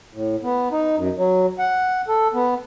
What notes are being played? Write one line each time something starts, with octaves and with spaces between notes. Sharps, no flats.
A2
B3
D#4
F#2
F#3
F#5
A4
B3